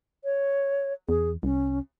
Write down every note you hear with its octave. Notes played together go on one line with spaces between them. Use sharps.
C#5
E2 G#4
C2 C#4